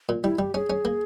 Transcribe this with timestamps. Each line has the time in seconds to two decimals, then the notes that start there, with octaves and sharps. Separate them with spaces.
0.09 A#2
0.23 G3 E4
0.39 G3 G4
0.54 C#4 G#4
0.70 C#4
0.85 A#3